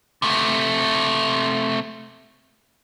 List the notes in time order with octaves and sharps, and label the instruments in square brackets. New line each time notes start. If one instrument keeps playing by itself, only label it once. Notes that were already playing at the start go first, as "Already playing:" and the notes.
[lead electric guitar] C3 A3